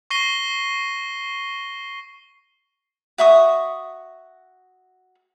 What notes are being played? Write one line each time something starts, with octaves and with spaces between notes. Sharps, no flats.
C#6 A#6 C7 D#7 G7
F#4 E5 C#6 D#6